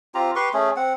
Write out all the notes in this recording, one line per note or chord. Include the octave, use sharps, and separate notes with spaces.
C4 F4 G4 A#5
G4 B4 C6 C#6
A3 C#4 G#4
C4 F#5